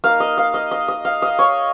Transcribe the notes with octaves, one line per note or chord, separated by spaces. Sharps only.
A#3 D#4 F5
D#5
F5
D#5
D#5
D#5
F5
D#5
C#5